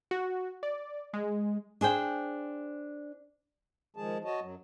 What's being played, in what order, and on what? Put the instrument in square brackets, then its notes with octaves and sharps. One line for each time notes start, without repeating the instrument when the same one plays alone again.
[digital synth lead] F#4
D5
G#3
[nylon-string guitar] D4 G#4 C5 G5
[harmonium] D#3 F3 G#3 G#4 A5
F#4 C#5 D#5 A5
F#2 F#3